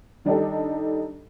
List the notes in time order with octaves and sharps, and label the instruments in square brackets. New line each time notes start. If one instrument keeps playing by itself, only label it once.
[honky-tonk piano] D#3 G3 D4 D#4 G4 A4